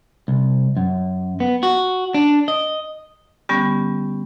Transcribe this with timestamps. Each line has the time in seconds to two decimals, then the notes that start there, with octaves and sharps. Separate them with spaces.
0.28 C2
0.77 F#2
1.40 B3
1.63 F#4
2.14 D4
2.48 D#5
3.49 D3 G3 B3 C#4 G4